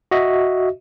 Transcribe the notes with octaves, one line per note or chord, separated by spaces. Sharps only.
F#4 D#5 E5